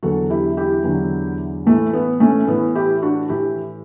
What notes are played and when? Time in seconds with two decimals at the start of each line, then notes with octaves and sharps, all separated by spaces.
0.03 E2 D3 F#3 F#4 A4
0.30 E4 G4
0.57 E4 G4
0.84 E2 D3 F#3
1.66 A2 E3 A3
1.93 B3
2.20 A3 C#4
2.47 A2 E3 B3
2.75 E4 G4
3.02 D4 F#4
3.29 A2 E3 E4 G4